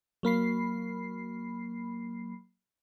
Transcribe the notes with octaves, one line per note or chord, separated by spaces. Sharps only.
F#3 A#3 B5 C7